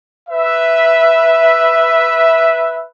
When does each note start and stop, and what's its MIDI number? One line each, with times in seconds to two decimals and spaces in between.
0.29 2.84 71
0.29 2.84 76